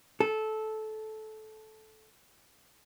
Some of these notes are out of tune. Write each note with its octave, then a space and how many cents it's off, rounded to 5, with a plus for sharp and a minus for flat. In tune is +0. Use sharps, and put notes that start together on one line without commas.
A4 -15